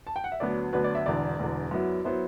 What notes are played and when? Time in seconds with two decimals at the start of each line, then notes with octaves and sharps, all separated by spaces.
0.07 A5
0.16 G5
0.24 F#5
0.32 E5
0.40 D2 D3 F#3 B3 D5
0.73 D2 D3 F#3 B3 B4
0.84 D5
0.95 E5
1.06 E1 E2 D3 D5
1.39 E1 E2 D3
1.71 F#2 F#3 B3 E4
2.04 F#3 B3 E4 C5